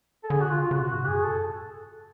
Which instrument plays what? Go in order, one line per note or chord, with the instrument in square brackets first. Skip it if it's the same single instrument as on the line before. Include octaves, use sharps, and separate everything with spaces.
[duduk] A4
[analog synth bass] D3 [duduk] G#4
[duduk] F#4
F4
[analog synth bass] C#3 [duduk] F4
[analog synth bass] C#3 [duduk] F#4
[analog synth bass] B2 [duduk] F#4
[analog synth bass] G#2 [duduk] F#4
[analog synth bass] F#2 [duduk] G#4
[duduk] A4